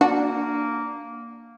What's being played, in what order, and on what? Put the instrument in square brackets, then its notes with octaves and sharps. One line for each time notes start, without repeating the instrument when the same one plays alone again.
[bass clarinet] A#3 [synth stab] D4 [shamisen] F#4